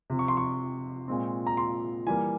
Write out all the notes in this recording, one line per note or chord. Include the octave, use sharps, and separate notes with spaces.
C3 F3 C4
C#6
C6
C#6
A#2 G#3 C4
A#5
C6
E3 G3 A#3 G#5